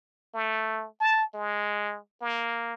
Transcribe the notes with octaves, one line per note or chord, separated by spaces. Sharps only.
A3
A5
G#3
A#3